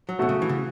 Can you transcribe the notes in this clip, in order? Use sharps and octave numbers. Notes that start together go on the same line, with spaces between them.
F#3
B2 A3 F#4 A4
C#3
E3
C#3